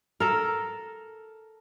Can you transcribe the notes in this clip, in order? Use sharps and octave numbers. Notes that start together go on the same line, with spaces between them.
A4 A#4